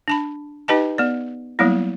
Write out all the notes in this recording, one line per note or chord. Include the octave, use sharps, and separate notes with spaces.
D4 A5 B5
D#4 G4 B4 D#5 G5 A5
B3 D5
F#3 G3 A#3 B3 E4